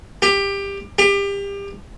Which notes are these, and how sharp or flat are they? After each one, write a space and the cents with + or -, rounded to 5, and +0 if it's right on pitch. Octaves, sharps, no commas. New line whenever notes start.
G4 +20
G4 +30